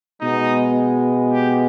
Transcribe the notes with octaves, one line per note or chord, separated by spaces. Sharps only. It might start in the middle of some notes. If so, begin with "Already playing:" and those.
B2 G#3 B3 D#4
G4